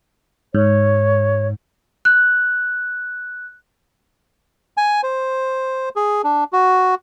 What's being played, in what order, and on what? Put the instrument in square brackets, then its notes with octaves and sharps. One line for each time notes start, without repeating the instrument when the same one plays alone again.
[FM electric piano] G#2 [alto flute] C#5
[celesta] F#6
[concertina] G#5
C5
G#4
D4
F#4